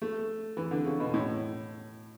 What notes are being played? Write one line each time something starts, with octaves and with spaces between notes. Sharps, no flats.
A3
E3
D3
C#3
B2
A2